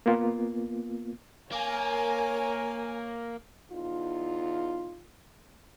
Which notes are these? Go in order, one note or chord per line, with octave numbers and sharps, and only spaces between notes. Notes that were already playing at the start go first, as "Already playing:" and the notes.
A#3 B3 F4
A#3 A#4 C#5 G#5
E2 D#4 F4